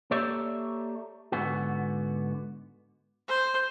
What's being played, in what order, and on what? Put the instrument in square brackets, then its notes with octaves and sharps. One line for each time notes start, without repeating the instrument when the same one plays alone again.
[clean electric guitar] A#3 G4 A4 C#5 D5 E5
G#2 D3 B3 F#4
[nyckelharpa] C5